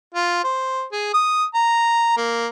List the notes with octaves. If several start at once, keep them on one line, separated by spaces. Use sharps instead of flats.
F4
C5
G#4
D#6
A#5
A#3